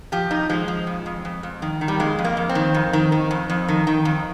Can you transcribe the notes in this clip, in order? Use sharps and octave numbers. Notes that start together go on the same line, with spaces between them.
F3 G4
F2 D#4
F3 G#3
F3
F2
F2
F2
F2
D#3
D#3
G3
F2 G#3
F2
A#3
F2
C4
D#3
F2
D#3
D#3
F2
F2
D#3
D#3
F2